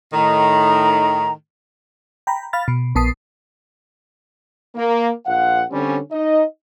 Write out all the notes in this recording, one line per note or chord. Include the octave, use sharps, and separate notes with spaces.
A2 D#3 A#5
G5 A#5 B5
F5 B5 F6 A6
B2
A#1 B3 A5 D#6 C7
A#3
A#1 F3 F5 F#5
D3 G3 C4 C#4
D#4 D#5